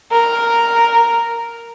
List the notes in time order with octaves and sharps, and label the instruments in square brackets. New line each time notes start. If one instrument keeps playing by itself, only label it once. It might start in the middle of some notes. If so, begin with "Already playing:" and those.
[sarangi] A#4